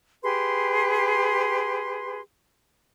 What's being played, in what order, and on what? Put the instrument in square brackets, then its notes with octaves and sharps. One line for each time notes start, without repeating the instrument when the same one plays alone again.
[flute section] G4 G#4 B4 C6